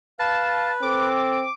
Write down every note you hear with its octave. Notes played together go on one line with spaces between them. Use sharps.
B4 F5 A5
C4 A4 D6